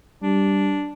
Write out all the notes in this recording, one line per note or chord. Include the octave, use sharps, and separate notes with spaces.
G3 D4